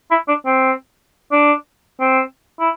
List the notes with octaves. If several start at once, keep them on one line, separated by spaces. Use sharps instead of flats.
E4
D4
C4
D4
C4
E4